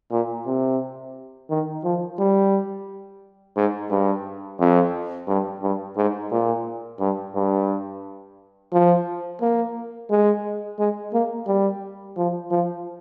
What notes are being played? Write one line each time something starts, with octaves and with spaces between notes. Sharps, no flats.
A#2
C3
D#3
F3
G3
G#2
G2
F2
G2
G2
G#2
A#2
G2
G2
F3
A#3
G#3
G#3
A#3
G3
F3
F3